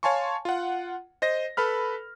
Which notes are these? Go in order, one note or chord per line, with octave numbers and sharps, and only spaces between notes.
C#5 F5 G#5 A5 C6 C#6
F4 F#5
C5 D#5 A#6
A4 B4 B5 F6